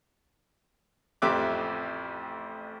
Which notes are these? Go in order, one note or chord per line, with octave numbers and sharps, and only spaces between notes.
A1 F2 G4 E5 D6 F#6